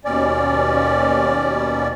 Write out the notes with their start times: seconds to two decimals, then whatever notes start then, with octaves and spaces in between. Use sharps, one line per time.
0.05 D#2 B2 C#4 D5